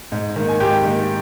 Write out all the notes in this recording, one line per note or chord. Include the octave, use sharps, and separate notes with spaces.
G#2
D#3 A#3
G#5
G#2 G4 G5
D#3 A#3